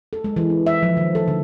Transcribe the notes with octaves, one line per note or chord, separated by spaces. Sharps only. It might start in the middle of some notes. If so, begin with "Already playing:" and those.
A4
G#3
E3
C4
E5
F3
D#3
A4
D3